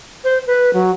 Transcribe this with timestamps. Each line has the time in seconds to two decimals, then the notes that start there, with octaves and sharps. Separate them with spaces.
0.24 C5
0.47 B4
0.73 F#3